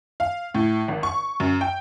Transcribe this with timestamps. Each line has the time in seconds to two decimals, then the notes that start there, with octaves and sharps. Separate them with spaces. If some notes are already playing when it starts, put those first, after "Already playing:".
0.20 F5
0.55 A2
0.88 G#1
1.03 C#6
1.40 F#2
1.61 G5